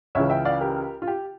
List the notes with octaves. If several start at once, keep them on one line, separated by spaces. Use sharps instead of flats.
C#2 C#3 E3 C#5 E5
E5 G5
D5 F5
G4 A#4
F4
G4